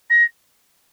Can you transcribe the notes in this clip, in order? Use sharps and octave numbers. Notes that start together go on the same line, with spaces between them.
A#6